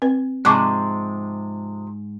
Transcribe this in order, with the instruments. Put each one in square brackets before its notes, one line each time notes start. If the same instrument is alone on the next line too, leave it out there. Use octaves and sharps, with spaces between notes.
[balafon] C4 B4
[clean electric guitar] G#2 [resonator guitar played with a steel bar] C3 F3 G#3 [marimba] C#6 D6 F#6